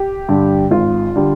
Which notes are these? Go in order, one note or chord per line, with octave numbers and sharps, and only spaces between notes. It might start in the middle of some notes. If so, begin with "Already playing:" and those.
Already playing: G4
G2 D3 G3
G#1 F4
D3 G3